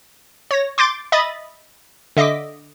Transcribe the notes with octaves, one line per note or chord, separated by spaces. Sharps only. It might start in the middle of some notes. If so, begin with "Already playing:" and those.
C#5 A#6
C6 D6 G6 A6 D7
D#5 E5 B5 D#6 A6
D3 D#5 E5 D6 B6